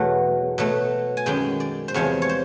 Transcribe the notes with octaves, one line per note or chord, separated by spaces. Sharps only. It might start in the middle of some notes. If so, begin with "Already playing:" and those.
Already playing: E2 B2 F#3 A3
B2 F#3 A3
G#5
F#2 D#3 G#3 G5
D5
C5
E2 C3 F3 G#3 C#5
C#5
C5